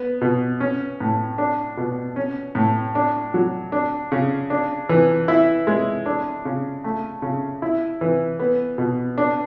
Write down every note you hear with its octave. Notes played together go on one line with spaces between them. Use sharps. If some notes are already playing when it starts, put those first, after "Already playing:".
Already playing: B3
B2
C#4
A2
D4
B2
C#4
A2
D4
F#3
D4
C#3
D4
E3
E4
G#3
D4
C#3
A3
C#3
E4
E3
B3
B2
D4